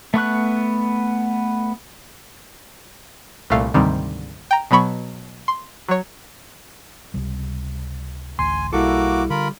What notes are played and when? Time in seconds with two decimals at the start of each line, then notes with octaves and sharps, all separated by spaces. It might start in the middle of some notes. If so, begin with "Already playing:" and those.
0.14 A3 B3 C#6 F#6
3.50 C2 A#2 A3 F5
3.74 D2 G#2 C3 D#3 G3 C4
4.51 G5 A#5
4.71 B2 F#3 B3 B5 C#6
5.48 C6
5.88 F#3 C#5
7.14 C#2 C3 G3
8.39 D1 A1 D2 G#5 C6
8.73 B1 G3 A#3 E4 F#4 A4 D6
9.30 D3 F4 A#4 B5